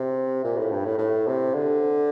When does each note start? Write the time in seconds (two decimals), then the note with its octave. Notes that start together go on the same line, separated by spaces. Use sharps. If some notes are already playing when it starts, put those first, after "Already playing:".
Already playing: C3
0.44 A#2
0.57 A2
0.71 G2
0.85 A2
0.98 A2
1.27 C3
1.54 D3